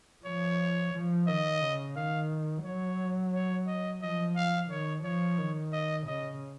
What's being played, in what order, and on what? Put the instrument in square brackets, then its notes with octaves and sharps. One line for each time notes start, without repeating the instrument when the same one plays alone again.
[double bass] F3 [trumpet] C#5
[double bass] F3
[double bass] D#3 [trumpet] D#5
[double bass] C#3
[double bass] D#3 [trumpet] F5
[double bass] F#3 [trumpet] C#5
[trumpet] C#5
D#5
[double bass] F3 [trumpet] D#5
[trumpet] F5
[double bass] D#3 [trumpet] C#5
[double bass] F3 [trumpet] C#5
[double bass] D#3
[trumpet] D#5
[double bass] C#3 [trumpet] D#5